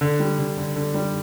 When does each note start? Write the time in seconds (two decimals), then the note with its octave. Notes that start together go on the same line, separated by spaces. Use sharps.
0.01 D3
0.20 G3
0.39 D3
0.57 D3
0.76 D3
0.94 G3